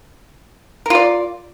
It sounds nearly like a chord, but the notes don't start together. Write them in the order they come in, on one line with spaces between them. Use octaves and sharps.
A#4 F4 D5